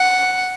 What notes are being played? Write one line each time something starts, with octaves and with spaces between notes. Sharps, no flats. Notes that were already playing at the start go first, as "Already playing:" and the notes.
Already playing: F#5